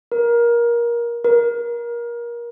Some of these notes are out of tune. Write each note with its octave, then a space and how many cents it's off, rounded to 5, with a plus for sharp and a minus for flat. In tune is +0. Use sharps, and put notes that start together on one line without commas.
A#4 +20
A#4 +25